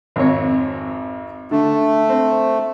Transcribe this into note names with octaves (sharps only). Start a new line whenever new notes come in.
G#1 F2 C#5
D3 A3
C4